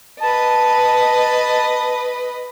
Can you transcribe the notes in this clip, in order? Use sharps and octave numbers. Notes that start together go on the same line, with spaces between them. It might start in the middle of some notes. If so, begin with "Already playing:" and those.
B4 D#5 A5